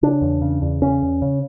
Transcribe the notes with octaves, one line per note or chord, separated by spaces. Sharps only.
C#3 D4
E2
C#3
E2
C#3 C#4
E2
C#3